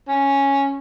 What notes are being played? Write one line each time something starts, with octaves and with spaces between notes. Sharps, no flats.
C#4